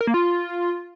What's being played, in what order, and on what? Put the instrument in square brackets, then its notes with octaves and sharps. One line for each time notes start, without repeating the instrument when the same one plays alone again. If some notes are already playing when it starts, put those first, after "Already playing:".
[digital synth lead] A#4
A#3
F4